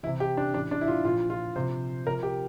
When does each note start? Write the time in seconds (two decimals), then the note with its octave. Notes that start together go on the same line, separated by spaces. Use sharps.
0.03 E3 E4
0.07 C3
0.20 G4
0.37 D4
0.54 A2 E3 D4
0.71 D4
0.81 E4
0.88 F4
1.04 A#2 F4
1.08 F3
1.30 F4
1.56 C3 F3 C5
2.06 C3 F3 A#4
2.23 G4